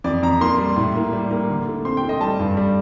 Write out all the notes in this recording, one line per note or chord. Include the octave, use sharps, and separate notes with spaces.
F2 D5
F2 A#5
A#3 C6
G3
A2
A#3
G3
A#3
D3
A3
C4 C6
G5
A3
D#5
G3 A5
G2
G3